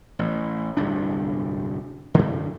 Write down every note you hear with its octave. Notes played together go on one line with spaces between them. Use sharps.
A1
D1 G1 C2 D4
F#2 D3